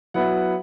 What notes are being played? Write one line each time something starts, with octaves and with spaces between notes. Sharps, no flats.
F#3 B3 E4 F#5